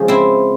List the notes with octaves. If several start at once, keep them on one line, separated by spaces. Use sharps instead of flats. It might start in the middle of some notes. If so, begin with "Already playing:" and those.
Already playing: C#3 F3 G#3
C4 E4